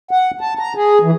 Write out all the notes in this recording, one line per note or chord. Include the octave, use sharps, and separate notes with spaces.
F#5
A5
A#5
G#4
E3